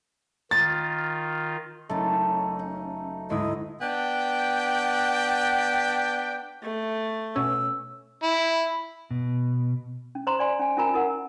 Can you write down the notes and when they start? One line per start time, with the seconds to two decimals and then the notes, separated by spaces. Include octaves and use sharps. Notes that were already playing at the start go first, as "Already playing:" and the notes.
0.51 D#3 F4 A6
1.89 F#1 A3 C#4 D#4 A6
2.59 D#4
3.30 D2 G#2 E4 D#5
3.81 B3 D4 G5
6.63 A3
7.36 B2 C#4 E6
8.23 E4
9.11 B2
10.15 C#4
10.27 C5 A#5 C6
10.39 D5 G#5 C6
10.59 C#4 G#5
10.77 C#4 F4 A#4 G#5 A#5
10.94 E4 A#4 F#5